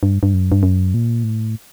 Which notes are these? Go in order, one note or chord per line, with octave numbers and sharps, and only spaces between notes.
G2
G2
F#2
G2
F#2
A#2
A2